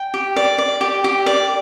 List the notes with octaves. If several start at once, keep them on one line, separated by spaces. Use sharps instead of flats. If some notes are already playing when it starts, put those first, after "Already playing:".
Already playing: G5
G4
D5
D5
G4
G4
D5